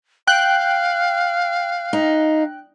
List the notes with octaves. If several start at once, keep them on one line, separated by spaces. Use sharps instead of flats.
F5 G5 F#6
D#4